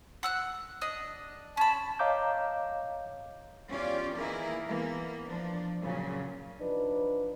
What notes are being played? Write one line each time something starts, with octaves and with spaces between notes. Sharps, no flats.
F#5 E6 F#6
D4 D#5
C#4 A5 B5
C#5 D#5 F5 A#5 D6 G6
E2 C#4 F4 G4 D5
D#3 E3 A#3 E4 G#4 A#4
E3 A#3 B3
F3 D4
A#2 C#3 F#3
F3 D4 D#4 B4